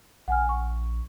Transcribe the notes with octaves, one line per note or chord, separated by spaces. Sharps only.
A#1 F#5 G#5 F6
C#6